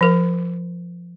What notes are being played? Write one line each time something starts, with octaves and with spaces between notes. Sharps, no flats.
F3 A#4